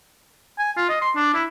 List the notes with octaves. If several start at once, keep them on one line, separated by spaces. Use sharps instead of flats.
G#5
F4
D#5
C6
D4
E4